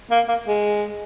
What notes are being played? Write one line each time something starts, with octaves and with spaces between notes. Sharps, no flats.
A#3
A#3
G#3